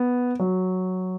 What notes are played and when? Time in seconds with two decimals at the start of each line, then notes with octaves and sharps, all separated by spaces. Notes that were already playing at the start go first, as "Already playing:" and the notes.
Already playing: B3
0.39 F#3